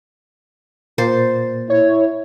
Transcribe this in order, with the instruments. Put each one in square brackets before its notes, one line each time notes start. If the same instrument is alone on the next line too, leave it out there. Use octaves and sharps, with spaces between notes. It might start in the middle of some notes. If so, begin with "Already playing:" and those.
[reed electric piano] A#2 A#3 A6 [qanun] C5
[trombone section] E4 [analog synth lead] C#5